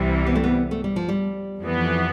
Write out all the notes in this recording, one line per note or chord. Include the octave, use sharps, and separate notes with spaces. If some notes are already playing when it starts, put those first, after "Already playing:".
Already playing: C2 C3 E3 G3
B3
A3
B3
A3
G3
F3
G3
F2 E3 B3